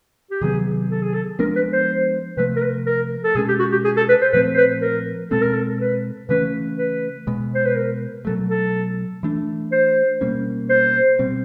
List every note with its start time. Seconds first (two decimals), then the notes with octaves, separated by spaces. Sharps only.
0.31 G4
0.41 C3 D#3 F#3 B3 G#4
0.90 A4
1.02 G#4
1.13 A4
1.39 F3 G#3 B3 D4 A#4
1.56 B4
1.72 C5
2.37 C3 F3 A3 B4
2.56 A#4
2.62 B4
2.86 A#4
3.24 A4
3.35 B2 G#3 C#4 G#4
3.48 G4
3.59 F#4
3.72 G4
3.85 G#4
3.97 A4
4.09 B4
4.21 C5
4.33 A#2 F3 A3 C4 B4
4.54 C5
4.57 B4
4.82 A#4
5.31 B2 G#3 C4 A4
5.42 A#4
5.54 A4
5.80 B4
6.29 C#3 E3 A3 C#4 B4
6.78 B4
7.27 B2 G#3 B3
7.55 C5
7.65 B4
7.76 A#4
8.25 B2 F#3 A3 A4
8.50 A4
9.23 E3 A3 D4
9.72 C5
10.21 B2 G3 A#3 C#4
10.70 C5
11.19 B2 G3 C4